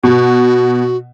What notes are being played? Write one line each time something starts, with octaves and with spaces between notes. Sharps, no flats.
B2 F#4